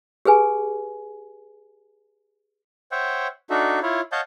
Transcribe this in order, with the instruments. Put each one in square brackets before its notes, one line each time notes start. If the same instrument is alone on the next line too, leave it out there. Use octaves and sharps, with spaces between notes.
[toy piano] G4 G#4 B4 G#5
[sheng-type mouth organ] C5 C#5 E5 F#5 G5
D4 D#4 F#4 A4 E5
E4 F4 C#5
C#5 D#5 F5 F#5 A5 G6